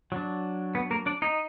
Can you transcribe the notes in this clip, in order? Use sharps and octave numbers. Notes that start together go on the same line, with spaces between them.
F#3 D4
B3 B4
A#3 A#4
D4 D5
D#4 D#5